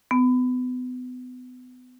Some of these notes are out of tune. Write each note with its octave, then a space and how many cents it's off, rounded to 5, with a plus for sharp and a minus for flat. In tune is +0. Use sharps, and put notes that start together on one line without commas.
B3 +30